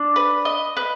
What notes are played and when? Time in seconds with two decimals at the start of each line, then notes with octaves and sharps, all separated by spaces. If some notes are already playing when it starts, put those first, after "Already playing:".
Already playing: D4
0.16 B4
0.45 D#5
0.77 B4